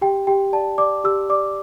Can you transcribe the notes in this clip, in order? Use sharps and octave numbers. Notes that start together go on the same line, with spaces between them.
G4 G5
G4 G5
D5 A5
D5 D6
G4 E6
D5 D6